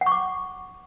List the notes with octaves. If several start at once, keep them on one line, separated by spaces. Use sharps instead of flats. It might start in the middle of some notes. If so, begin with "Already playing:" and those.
F#5
C#6
D6